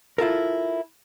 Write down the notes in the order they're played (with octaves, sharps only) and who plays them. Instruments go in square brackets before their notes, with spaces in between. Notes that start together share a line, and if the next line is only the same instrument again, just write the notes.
[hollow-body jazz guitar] E4 F4 A4 A#4